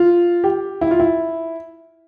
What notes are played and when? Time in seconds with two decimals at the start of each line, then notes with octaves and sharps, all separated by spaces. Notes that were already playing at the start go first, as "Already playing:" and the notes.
Already playing: F4
0.44 G4
0.81 E4
0.91 F4
1.00 E4